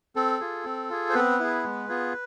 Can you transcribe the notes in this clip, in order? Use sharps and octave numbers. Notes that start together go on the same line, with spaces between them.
C4 A4
F4 G#4
C4
F4 G#4
C5
B3 C4 B4
E4 G#4
G#3
B3 F4 G#4